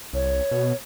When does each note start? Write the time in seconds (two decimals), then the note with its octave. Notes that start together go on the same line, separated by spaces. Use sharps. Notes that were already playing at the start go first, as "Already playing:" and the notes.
0.13 C2 C#5
0.51 B2